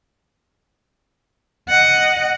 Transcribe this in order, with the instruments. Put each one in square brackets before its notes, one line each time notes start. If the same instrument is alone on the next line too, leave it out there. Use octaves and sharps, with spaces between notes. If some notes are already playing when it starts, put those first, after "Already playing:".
[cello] D#5 F#5